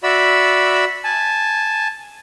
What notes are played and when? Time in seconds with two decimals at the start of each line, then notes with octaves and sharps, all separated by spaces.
0.03 F#4 D5 E5 B5 E6
1.04 G#5 A5